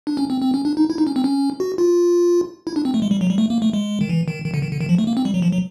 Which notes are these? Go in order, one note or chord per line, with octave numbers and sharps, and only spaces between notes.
D4
C#4
C4
C4
C#4
D4
D#4
E4
D#4
C#4
C4
C#4
F#4
F4
E4
D4
C4
A3
G#3
G3
F#3
G3
A3
A#3
A3
G#3
D#3
E3
D#3
D#3
D3
D#3
D3
D#3
F3
A3
A#3
C4
G3
F#3
F3
F#3